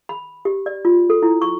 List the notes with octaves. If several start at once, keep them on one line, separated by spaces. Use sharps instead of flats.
B5
G4
D5
F4
A4
E4
C#6